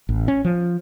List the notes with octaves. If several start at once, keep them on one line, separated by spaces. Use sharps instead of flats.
A1
C#4
F3